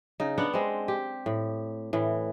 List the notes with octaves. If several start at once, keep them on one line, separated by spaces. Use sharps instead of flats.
C#3 D#4
B3 D4 F#5
G#3 C4
G4
A2
A2 E3